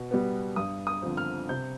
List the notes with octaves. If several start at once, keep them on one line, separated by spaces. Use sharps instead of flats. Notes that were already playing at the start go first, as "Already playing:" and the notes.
Already playing: B2
G3 B3
G2 D#6
D#6
D3 F3 C4
F6
C3 G6